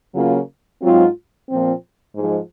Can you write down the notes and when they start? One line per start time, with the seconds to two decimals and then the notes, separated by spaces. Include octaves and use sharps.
0.14 C#3 F#3 A#3 F4
0.81 G#2 F#3 C4 F4
1.48 A#2 F3 C4
2.14 G#2 F3 G#3